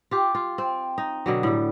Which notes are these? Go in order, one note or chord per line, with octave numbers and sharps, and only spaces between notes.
F4 G4
F4
C4
D#4
B2 D3 F#3
A2 G3